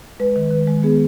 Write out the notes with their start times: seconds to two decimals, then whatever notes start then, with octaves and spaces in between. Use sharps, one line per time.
0.20 G#3 B4
0.36 D#3
0.51 D#3
0.68 G#3
0.83 B3 G#4